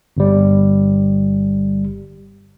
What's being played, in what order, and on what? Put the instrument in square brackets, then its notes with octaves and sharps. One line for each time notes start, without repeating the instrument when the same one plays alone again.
[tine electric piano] G1 G3